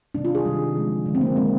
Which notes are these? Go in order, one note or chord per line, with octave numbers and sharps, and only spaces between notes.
C3 D#3 G3 D4
F4
G#4
C3 D#3 G3
D3 F3 G#3
D3 F3 G#3
C4
A#3
D#3 G#3 C4